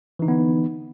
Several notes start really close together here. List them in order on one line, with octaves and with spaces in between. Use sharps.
E3 D#4 D3 B3